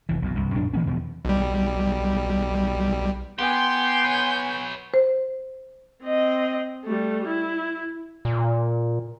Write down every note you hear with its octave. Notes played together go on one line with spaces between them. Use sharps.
F1 E3
B1 F2 B2
C2 G2
A#1 F#2 D4
E3 A#3 C#4
E2 B2 E3 F3
B1 G3
B3 G4 G#5 C6 G6
B4 C#5
C5
C4 D#5
G3 A3
E4
A#2